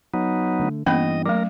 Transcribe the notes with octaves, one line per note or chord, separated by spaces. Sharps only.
F#3 B3 D#4
D3 A3
G2 E3 A#3 B3 C#4 D#5 B5
F#3 A3 A#4